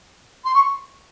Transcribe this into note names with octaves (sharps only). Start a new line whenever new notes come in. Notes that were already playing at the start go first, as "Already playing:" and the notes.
C6
C#6